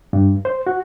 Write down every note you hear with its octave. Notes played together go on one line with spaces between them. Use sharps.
G2
C5
F#4